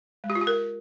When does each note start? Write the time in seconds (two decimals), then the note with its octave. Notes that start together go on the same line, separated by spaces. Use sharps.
0.24 G#3
0.30 G4
0.35 F4
0.41 G4
0.47 A#4